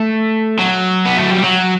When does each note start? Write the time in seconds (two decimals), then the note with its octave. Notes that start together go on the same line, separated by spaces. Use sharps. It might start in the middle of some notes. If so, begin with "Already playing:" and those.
Already playing: A3
0.59 F#3
1.06 B3
1.18 A3
1.31 G3
1.44 F#3